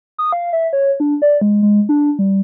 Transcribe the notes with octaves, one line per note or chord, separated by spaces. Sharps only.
D#6
F5
E5
C#5
D4
D5
G#3
G#3
D4
G3